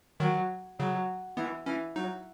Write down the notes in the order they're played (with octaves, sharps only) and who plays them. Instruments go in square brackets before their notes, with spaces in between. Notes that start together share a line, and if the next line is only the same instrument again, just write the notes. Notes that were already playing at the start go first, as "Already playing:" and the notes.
[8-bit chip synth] D#3 [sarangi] F#3
[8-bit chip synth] C#3 [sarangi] F#3
[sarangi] E3 [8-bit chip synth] B3
[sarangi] E3 [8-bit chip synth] C#4
[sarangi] F#3 [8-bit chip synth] D#4